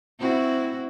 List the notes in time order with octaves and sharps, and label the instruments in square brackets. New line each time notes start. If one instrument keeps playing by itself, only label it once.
[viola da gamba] C4 E4 F#4